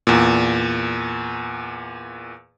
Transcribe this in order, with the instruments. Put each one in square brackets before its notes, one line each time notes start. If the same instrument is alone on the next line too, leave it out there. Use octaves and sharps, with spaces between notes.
[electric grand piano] E2 A#2